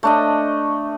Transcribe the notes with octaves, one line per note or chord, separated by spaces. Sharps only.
A3 D4 D#5